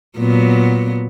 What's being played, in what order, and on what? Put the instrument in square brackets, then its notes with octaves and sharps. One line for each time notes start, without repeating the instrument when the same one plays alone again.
[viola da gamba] A#2 F#3 B3